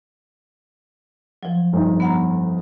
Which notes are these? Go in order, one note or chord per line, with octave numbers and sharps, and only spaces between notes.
F3 F#3
G1 F2 D#4
B3 F#5 A#5